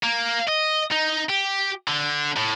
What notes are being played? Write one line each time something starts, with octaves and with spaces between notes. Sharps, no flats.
A#3
D#5
D#4
G4
D3
A2